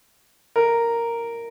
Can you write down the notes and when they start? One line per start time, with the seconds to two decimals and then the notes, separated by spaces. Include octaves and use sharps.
0.56 A#4